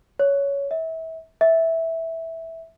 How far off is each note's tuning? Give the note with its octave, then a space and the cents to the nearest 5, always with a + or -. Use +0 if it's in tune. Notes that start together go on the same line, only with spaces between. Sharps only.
C#5 +15
E5 -30
E5 -10